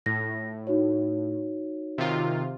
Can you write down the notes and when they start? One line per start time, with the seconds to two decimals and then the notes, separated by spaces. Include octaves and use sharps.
0.06 A2 A#6
0.67 D#4 F#4 C#5
1.98 C3 D#3 F4